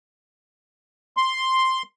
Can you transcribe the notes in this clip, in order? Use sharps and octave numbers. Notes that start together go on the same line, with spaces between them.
C6